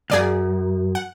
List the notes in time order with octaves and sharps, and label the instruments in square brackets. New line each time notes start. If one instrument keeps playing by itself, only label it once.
[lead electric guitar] C#2 F#2 [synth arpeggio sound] G#4 D5 F5
[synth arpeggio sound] F#5